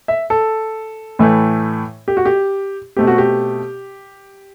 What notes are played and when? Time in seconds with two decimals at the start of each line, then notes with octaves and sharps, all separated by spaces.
0.08 E5
0.30 A4
1.19 A2 E3 A3
2.08 G4
2.17 F#4
2.25 G4
2.97 B2 A3 C4 G4
3.07 F#4
3.18 G4